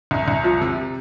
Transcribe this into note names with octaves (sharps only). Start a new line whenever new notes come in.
C2
C2
F3
C3